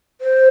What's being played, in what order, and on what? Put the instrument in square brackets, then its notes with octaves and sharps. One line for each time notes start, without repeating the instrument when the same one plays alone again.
[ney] C5